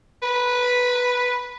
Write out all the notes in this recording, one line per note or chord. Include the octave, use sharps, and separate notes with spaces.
B4